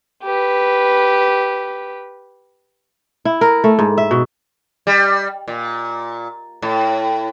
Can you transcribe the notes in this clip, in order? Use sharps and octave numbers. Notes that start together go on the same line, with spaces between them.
G4 B4
E4
A#4
A3
G#2
E5
B2
G3
A#2
A2